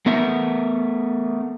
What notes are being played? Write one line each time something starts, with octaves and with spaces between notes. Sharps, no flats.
A3 B3 A#4 E5